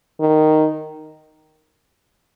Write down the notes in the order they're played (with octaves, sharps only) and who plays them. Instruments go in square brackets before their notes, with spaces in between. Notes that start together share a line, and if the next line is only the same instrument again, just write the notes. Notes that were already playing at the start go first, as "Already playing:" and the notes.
[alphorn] D#3